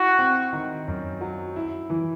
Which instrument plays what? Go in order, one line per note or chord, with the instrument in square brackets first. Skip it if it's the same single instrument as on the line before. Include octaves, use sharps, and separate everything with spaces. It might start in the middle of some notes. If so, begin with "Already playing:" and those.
Already playing: [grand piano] E4 [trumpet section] F#4
[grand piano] C4
D#3
F#2
F#3
E4
E3